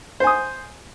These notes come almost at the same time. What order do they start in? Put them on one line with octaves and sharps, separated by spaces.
C5 G#5 D#6